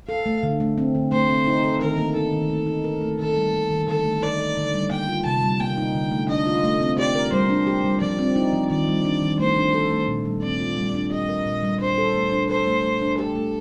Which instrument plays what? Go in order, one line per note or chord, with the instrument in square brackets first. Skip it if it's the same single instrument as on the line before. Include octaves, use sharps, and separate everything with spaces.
[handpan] A4 [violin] F5
[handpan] A3
D3
A3
C4
D3
[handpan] A3 [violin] C5
[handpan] C4
D#4
A4
[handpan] D#3 [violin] A#4
[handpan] A#3
[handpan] D#4 [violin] A4
[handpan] D#3
A3
D#4
A#4
A3
[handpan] D#3 [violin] A4
[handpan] G3
A#3
D#3
[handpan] D3 [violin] A4
[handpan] A3
[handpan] D#4 [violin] D5
[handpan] A4
D3
G3
[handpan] A#3 [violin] G5
[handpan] F4
[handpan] C3 [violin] A5
[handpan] G3
[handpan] A#3 [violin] G5
[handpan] D#4
D3
A3
[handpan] D4 [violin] D#5
[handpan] F4
A3
C4
[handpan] G4 [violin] D5
[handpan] A#4
[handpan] G3 [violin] C5
[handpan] D4
G4
G3
[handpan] F3 [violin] D5
[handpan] C4
D#4
F3
[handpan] D#3 [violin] D5
[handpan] G3
D4
D#3
[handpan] A3 [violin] C5
[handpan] D4
A4
A3
A#2
G3
[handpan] C4 [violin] D5
[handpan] F4
G3
D4
[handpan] G4 [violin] D#5
[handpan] A#4
A#2
G3
[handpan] D4 [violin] C5
[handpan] A4
A3
D4
[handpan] A4 [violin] C5
[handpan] A3
A3
D4
[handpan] G4 [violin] A4
[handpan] A3